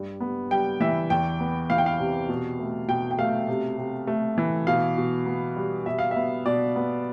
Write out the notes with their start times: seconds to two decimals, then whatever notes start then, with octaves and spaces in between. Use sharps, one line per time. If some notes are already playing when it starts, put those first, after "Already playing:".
Already playing: G2 G3
0.20 B3
0.51 G3 G5
0.80 E3 E5
1.10 E2 G5
1.40 B3
1.70 E3 F5
1.78 G5
1.86 F5
1.99 C3
2.29 B2
2.59 A3
2.88 B2 G5
3.11 G5
3.19 A3 F5
3.49 C3
3.78 C3
4.07 A3
4.38 E3
4.67 B2 F5
4.97 B2
5.26 B3
5.57 G3
5.86 B2 E5
5.99 F5
6.11 E5
6.16 B3
6.46 B2 D5
6.76 B3